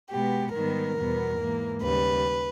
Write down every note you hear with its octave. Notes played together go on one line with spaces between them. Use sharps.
B2 G#3 B3 G4
G#2 D#3 G3 B3 A#4
E2 B2 G3 B3
G#2 E3 A#3
D#2 C#3 G3 B4